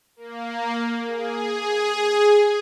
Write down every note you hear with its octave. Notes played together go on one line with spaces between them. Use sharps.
A#3
G#4